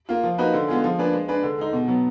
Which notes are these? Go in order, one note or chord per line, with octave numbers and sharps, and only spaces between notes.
A#3 F4
F3
A#3 D#4 F#4 B4
D3
G#3 B3 F4 G#4
F3
A#3 D4 G#4 B4
G#3
D4 G#4 B4
D3
G#3 D#4
B2
F#3 B3